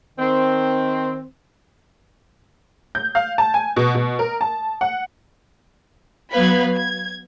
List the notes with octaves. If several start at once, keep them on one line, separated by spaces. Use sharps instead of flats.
D#3 C4
G6
F5
A5
G#5
B2
B2
A#4
A5
F#5
F#3 B3 B4 F5 B5 G#6
G#6